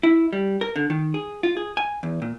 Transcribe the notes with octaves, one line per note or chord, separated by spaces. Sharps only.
E4
G3
A#4
D3
D#3
G#4
F4
G#4
G#5
E2
A#2